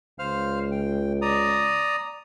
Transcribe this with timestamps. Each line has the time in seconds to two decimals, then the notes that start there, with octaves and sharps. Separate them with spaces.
0.19 C#2 C5 F5 F6
0.71 G5
1.22 D5 A#5 D#6